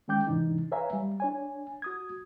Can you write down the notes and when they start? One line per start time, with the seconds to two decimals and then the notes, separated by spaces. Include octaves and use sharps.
0.08 D#3 G#3 C#4 G5 D6 G6
0.27 G#2 C3 E3 D4 D#4
0.72 B4 C#5 E5 F5 G#5 A#5
0.93 G3
1.20 D4 C#5 G#5
1.82 F#4 D#6 G#6